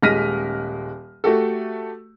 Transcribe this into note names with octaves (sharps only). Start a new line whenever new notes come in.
D#1 G#3 F6 A#6 B6 D#7
A3 F#4 G4 A4